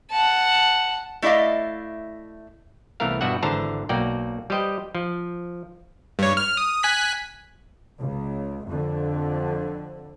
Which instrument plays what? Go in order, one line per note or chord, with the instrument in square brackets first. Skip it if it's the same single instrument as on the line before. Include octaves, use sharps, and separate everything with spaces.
[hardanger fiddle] F#5 A5
[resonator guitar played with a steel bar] A3 E4 D5 D#5 F5
[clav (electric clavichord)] C2 E3 A3 B3 A#4 F5
G2 B2 G3 F#4 E5 F#5
G#1 D3 E3 C5 A5 A#5
B1 A#3 F#4 D5 G5
G3 G4 B4 C5 D#5 G5
F3
[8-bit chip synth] G2 C#5
F6
D#6
G#5 F#6 B6
[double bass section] C#2
F2 D3